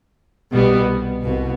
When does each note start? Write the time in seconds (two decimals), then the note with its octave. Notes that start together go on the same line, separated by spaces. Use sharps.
0.53 C2 B2 G3 B3
1.24 C2 B2